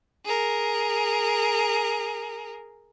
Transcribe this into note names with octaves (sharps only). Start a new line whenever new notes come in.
G#4 A#4